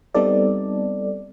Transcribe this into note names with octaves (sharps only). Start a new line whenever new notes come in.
G3 B3 C4 D#4 A4 D5